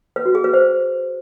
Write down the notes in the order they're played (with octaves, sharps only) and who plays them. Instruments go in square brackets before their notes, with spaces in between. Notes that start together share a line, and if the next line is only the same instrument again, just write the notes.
[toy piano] B4
F#4
G#4
B4
C5